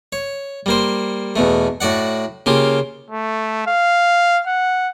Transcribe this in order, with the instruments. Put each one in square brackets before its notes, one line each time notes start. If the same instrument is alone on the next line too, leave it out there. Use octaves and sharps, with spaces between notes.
[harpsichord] C#5
G3 A#3 C5
E2 B2 A3
A2 F#4 D5 F#5
C#3 A#3 F4 G4
[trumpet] A3
F5
F#5